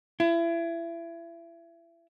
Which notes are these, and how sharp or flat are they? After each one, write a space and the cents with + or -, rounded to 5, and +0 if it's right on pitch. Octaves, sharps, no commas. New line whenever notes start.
E4 +30